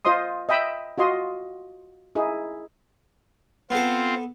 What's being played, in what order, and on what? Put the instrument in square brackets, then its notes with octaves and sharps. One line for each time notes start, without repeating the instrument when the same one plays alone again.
[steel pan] F4 C5 D#5 C6 D#6
D#5 E5 G5 B5 E6
F4 F#4 D#5 C6
D#4 E4 G#4
[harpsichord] B3 A4 [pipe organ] C4 F4